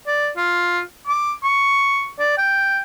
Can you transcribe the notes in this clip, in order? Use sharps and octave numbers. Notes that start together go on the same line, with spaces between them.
D5
F4
D6
C#6
D5
G5